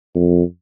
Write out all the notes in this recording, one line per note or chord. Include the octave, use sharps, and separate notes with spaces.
F2